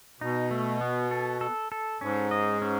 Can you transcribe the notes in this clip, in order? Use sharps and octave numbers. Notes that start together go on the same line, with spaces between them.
B2 D#4
A3
B3
A4
A4
A4
G#2 C#4
D#5
C#4